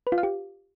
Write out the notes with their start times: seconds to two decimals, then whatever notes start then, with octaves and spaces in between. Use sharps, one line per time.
0.07 B4
0.12 F4
0.18 F5
0.23 G4